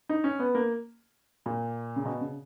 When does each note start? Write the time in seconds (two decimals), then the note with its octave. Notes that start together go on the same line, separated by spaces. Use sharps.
0.09 D#4
0.24 C#4
0.39 B3
0.55 A#3
1.46 A#2
1.96 C#3
2.05 B2
2.21 C#3